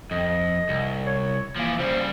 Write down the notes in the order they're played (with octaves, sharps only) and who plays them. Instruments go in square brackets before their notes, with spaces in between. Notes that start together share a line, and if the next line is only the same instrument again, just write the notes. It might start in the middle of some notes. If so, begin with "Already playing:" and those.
[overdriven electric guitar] F2 [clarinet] D#5
[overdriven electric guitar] C2
[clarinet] C#5
[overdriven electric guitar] E3 F3 [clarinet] A#3
[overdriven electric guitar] C#3 G3 [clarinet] C5